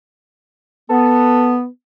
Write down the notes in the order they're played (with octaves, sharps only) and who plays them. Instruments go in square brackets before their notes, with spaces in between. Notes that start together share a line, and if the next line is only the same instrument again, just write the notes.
[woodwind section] B3 [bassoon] A4